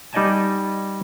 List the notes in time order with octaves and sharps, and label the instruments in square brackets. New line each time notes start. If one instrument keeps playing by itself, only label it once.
[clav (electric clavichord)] G3 D#4 D5 D#5 G#5 A5